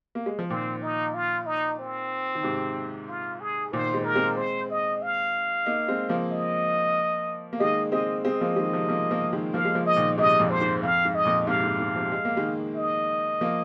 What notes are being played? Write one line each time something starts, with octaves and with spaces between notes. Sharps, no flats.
A#3
G#3
F3
A#2 D#3 C4
D#4
F4
D#4
C4
D#3
G#2 C3
F4
G#4
A#2 D#3 C5
D#3 G#3
A#4
G#3 C4
C5
D#5
F5
A#3 D#4
G#3 C4
F3 A#3
D#5
A#3
D#3 G#3 D#5
G#3 C4 D#5
G#3 C4 D#5
F3 A#3
D#3 G#3
C3 F3
F3 A#3
F3 A#3
D#3 G#3
F3 A#3 F5
G#3
F3 A#3
D#5
A#2 D#3
G#2 C3 D#5
F2 A#2
C5
G#2
F2 F5
G#2
D#5
F2 A#2
G#2 C3 F5
G#2
G#2
C3 F3
G#3
A#3
D#3 G#3
D#5
F3 A#3